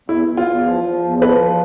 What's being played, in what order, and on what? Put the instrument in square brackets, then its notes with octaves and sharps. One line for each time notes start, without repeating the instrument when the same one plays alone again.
[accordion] E2 [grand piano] E4
[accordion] E2
[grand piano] F4
[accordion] E2
F3
F3
E2
[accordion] F3 [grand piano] B4